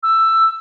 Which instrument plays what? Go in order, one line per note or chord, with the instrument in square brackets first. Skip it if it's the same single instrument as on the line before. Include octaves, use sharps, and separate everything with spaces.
[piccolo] E6